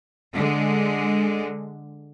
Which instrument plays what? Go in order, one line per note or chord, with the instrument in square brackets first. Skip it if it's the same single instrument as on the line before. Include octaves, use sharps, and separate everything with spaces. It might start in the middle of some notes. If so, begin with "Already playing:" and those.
[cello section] D3 G#3